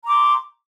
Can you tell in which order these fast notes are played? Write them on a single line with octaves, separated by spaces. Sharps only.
A#5 D6 C6